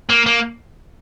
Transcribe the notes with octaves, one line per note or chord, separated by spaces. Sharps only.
A#3
A#3